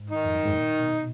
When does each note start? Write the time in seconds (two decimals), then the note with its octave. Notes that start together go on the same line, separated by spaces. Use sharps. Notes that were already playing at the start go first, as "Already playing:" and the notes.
Already playing: G#2
0.10 D#3 D#4
0.25 F2
0.35 F#2
0.45 G#2
0.56 A#2
0.79 B2